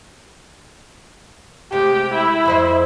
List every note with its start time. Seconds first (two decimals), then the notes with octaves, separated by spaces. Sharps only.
1.72 C3 G#3 A3 G4
2.15 E4
2.45 F2 C5 D#5